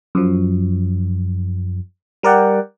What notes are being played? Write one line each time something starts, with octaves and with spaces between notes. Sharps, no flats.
F#2 F3
G3 A#4 D5 F#5 G5